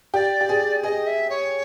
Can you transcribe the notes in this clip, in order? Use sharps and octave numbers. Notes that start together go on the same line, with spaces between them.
G4 D5
G4
G#4
G#4 D#5
E5
C#5